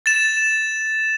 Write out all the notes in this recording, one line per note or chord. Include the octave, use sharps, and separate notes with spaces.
A6 E7